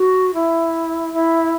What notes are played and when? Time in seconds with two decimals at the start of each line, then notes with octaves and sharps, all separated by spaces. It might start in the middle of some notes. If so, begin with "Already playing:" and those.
Already playing: F#4
0.33 E4
1.12 E4